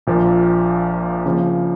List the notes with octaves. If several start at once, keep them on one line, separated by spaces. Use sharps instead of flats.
A#1 A#2 F3 A#3
C#3 F3 A#3